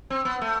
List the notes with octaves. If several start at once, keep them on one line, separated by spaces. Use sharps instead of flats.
C4
B3
A3